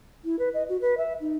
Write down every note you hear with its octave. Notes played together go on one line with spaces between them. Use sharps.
E4
B4
D#5
F#4
B4
E5
D#4